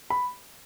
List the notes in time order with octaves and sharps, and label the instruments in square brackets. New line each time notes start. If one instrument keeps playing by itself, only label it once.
[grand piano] B5